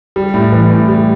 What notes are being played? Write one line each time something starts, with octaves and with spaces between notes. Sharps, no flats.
G3
A2
E3
A2
G3